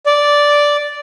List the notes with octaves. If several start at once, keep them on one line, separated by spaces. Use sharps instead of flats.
D5